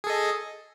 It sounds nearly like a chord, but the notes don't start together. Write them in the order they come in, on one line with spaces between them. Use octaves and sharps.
G#4 A4 D#5